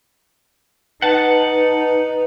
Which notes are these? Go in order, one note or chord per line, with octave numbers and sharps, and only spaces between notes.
D#4 B4 F#5 A5